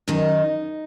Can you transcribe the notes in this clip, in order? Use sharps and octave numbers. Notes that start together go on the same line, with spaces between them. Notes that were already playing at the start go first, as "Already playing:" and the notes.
F#2 D#3 D#4